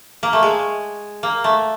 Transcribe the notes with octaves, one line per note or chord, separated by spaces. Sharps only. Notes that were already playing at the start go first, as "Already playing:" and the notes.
A#3
A3
G#3
A#3
A3